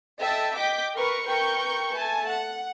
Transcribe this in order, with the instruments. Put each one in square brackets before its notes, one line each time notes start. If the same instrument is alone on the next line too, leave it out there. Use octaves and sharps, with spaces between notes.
[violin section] A4 D#5 E5 G5 A5
D#5 G5 D6 G6 B6
A#4 B4 C#6
A#4 B4 G5 C#6 G6
A3 G#5 A5
F#5